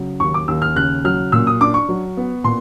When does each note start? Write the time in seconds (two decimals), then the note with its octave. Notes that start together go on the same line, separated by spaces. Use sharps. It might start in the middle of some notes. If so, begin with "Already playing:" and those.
Already playing: C#3 F#3
0.20 D#2 C#6
0.34 D6
0.48 D#2 E6
0.62 F6
0.76 C#3 F#6
1.04 F#3 F6
1.32 A#2 E6
1.47 D#6
1.61 D4 D6
1.74 C#6
1.89 F#3
2.17 B3
2.44 A#2 C6